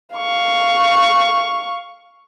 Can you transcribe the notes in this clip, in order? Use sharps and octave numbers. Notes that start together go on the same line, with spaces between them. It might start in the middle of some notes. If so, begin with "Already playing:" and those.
F5 C#6